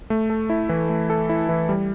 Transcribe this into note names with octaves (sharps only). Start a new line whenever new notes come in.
A3
A4
E4
E3
A3
A4
E4
E3
G3